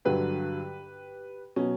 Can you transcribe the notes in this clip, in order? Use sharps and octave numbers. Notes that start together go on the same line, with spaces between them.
G2 D3 F#3 G4 B4
B2 F#3 C#4